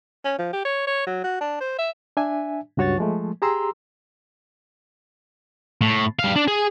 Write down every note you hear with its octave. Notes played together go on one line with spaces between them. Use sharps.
C#4
F3
G4
C#5
C#5
F#3
F#4
D4
C5
E5
D4 E5 G#5
C#2 G2 F#4 C#5 C#6 A6
F3 G#3 A3
G4 G#4 A#5 C6 E6
A2
G3 F5
D4
G#4